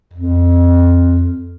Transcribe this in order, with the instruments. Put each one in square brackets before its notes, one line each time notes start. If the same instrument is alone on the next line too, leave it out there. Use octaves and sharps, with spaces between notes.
[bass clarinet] F2